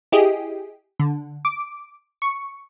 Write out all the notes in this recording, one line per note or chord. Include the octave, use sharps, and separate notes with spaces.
E4 G4 G#4 D#5
D3
D6
C#6